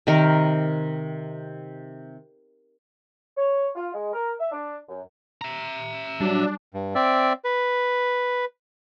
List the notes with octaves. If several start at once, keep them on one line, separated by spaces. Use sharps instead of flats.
C3 D#3 A#4
C#5
F4
G#3
A#4
E5
D4
F#2
E5 A#5
F#3 G3 D4
G2
C4 D5 E5
B4